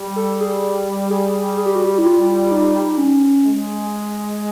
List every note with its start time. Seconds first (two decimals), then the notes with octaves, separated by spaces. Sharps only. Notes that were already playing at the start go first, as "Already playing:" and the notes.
Already playing: G3
0.16 A4
0.41 G#4
1.10 G#4
1.57 G#4
1.66 G4
1.75 F#4
1.85 G4
1.98 E4
2.05 F4
2.51 D#4
2.97 C#4
3.45 G#3